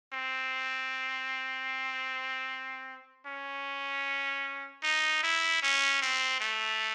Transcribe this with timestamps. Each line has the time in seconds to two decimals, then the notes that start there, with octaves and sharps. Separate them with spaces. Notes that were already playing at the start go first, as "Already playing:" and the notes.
0.13 C4
3.26 C#4
4.83 D#4
5.23 E4
5.62 C#4
6.01 C4
6.40 A3